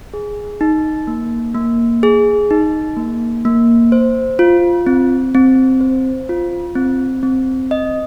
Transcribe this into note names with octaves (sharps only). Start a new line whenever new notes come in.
G#4
D#4
A#3
A#3
G#4
D#4
A#3
A#3
C5
F4
C4
C4
C5
F4
C4
C4
D#5